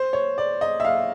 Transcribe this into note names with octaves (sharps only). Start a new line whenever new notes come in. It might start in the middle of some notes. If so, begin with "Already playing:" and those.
Already playing: C5
C#5
D5
D#5
E5
F5